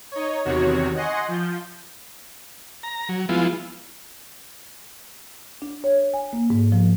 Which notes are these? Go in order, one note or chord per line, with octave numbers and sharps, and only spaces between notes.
D#4 C#5
E2 C3 D#3 F#4 C#5
D#5 F#5 G#5 C6 C#6
F3 G6
A#5
F#3
F3 G#3 B3 E4 F4
D4
C#5
G#5
A#3
G#2
F3